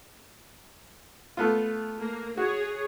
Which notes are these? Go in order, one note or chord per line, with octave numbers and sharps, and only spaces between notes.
A3 B3 F4
A#3
F#4 G#4 C#5